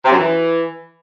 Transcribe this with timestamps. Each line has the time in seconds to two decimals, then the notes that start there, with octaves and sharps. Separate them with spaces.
0.05 C3
0.12 F#2
0.18 E3